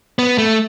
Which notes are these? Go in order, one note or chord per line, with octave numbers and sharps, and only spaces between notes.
B3
A3